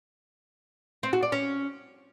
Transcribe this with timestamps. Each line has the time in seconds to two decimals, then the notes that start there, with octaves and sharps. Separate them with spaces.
1.03 C4
1.13 F#4
1.23 D5
1.32 C#4